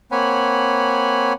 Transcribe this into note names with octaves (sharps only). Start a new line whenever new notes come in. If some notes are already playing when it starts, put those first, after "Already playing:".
A#3 C4 C#5 F#5 G#5 B5